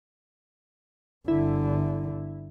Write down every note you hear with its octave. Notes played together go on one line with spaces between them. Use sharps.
G1 D3 E4